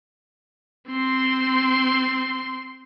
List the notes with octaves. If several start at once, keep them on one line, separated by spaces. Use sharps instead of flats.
C4 C6